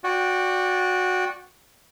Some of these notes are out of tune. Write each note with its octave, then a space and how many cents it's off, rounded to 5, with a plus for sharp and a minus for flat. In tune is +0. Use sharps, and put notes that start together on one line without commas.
F#4 -15 D5 -10 G5 +0